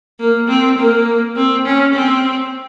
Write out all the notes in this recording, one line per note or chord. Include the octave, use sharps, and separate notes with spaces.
A#3
C4
A#3
C4
C#4
C4